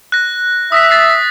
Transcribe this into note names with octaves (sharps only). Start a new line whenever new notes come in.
F#6 A#6
E5 D#6 A#6 B6
A6 C7